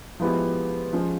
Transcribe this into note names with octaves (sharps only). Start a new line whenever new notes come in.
F3 G#3 B3 E4 G4
F3 G#3 C#4 F4